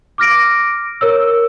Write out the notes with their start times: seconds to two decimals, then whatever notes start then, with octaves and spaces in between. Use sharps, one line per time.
0.18 D6 F6 A#6 D7
1.01 A#4 C#5 E6